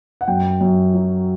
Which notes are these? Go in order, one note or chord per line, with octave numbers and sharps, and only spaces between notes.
F#5
F#2 G5
F#2
F#3